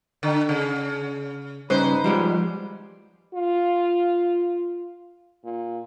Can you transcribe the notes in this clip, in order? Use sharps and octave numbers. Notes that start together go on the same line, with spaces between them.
D3
C#3
G2 C#3 D#4 B4 C5
F3 G3 G#3
F4
A#2